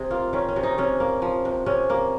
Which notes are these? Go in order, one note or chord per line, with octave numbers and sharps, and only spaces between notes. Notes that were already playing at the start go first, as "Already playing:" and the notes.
Already playing: C3 G#4
A#3 F4
D#3 C#4
C#4
C3
D#4
C3 C#4
A#3
F3
C3
C3 C#4
A#3